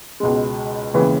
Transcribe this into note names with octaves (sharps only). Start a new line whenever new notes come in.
C#2 B2 G#3
E1 D#2 C#3 E3 B3